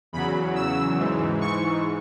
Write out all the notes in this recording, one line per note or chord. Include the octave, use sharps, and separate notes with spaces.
E2 C#3 F#3 B5
E6
G#2 E3
C#6